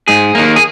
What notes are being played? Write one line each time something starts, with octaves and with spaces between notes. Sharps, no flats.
G#2 G#4
D#3 A#3
G#4